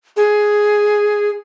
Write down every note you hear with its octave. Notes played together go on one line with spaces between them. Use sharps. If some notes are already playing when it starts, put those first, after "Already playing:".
G#4